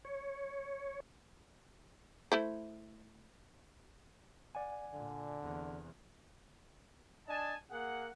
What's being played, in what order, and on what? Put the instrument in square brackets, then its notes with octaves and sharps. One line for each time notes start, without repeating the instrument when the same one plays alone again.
[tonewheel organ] C#5
[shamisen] A3 E4 C5
[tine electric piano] D5 F#5 G#5
[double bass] A#2 [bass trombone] D3
[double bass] E2 C3
[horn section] D4 D#5 G#5 A5
A#3 G#4 F#5